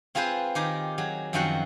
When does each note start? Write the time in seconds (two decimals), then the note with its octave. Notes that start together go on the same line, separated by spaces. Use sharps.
0.15 C4 F4 G#4 B4 C5
0.55 D#3 G4 G#4 A#4
0.98 F#3 G#4
1.33 F#2 D#3 F3 C4 F#4 F#5